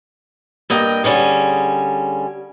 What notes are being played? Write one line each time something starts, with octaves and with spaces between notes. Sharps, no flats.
G2 A#3 D#5 G5
D3 G3 C#4 G#4